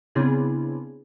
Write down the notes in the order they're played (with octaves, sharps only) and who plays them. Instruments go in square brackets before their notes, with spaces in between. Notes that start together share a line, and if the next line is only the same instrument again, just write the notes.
[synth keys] C#3 B3 C4 D4 E4 G#4